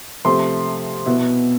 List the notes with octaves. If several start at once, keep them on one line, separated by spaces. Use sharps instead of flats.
C3 F3 A3 C6
B2 B3 E4